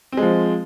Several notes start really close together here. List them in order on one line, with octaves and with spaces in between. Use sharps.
C4 G#3 F3